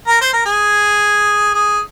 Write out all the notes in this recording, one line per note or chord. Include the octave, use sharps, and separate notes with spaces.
A#4
C5
A#4
G#4
G#4